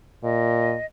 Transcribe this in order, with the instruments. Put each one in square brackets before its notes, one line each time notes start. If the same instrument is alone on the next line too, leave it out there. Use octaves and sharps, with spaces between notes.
[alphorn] A#2 [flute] D#5